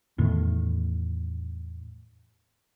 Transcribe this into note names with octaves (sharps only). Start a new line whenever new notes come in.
E2 A2 D#3